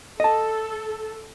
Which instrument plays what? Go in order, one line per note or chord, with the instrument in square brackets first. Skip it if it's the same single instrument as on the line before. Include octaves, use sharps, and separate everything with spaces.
[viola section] A4 [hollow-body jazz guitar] D#5 A5